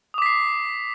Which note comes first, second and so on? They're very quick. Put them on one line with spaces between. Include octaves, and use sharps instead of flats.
D#6 D6 B6 C7